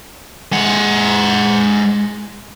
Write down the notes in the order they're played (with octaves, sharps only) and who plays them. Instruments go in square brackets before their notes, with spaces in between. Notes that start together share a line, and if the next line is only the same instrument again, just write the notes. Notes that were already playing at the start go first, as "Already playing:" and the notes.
[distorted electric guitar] G#3 F#5